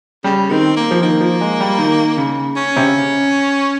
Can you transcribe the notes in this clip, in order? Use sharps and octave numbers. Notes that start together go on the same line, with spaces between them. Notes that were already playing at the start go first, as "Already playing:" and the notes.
C#3 G3
D#3 C4
A#3
F3
D#3 A#3
F3
G#3
G3
D#3
C#3
C#4
C3
C#3